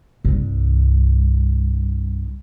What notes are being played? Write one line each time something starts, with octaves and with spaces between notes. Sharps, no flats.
C2 G2